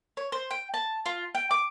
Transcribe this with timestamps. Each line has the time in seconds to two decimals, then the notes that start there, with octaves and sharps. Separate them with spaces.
0.17 C#5
0.32 C5
0.51 G5
0.74 A5
1.06 F4
1.35 G5
1.51 D6